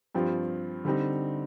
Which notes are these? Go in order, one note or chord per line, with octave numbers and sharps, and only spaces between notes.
G2 F3 C4 F4
D3 G3 C4 D#4